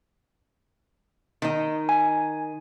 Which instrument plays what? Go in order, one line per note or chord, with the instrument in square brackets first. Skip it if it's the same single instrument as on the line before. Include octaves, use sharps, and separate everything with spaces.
[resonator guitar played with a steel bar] D#3 D#4
[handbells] G#5